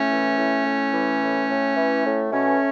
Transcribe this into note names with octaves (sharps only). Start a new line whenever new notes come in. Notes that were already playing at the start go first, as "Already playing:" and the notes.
Already playing: A2 A3 C#4
E3
A2
A2
E3
A2
A2
E3
A2
B2 A3 C#4